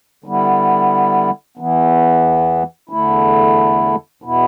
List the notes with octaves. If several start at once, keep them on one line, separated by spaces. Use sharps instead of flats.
D3 G3 B3 E4
E2 E3 B3
E2 D3 A3 E4
E2 B2 B3 E4